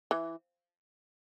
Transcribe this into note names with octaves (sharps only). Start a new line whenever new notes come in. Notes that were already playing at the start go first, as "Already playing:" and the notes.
E3